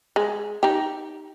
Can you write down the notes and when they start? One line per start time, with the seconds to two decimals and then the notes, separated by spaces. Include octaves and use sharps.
0.16 G#3
0.63 D#4 G4